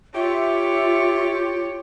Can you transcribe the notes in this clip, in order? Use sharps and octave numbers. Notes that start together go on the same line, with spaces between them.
F4 G4 C#5 E5